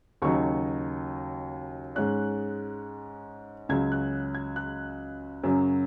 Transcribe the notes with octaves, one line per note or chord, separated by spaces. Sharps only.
D#2 C#3 F#3 D#4 C#6
G#2 G#3 C#4 F#6
C#2 C#3 F#3 C#4 G#6
F#6
G#6
F#6
F#2 C#3 F#3 C#4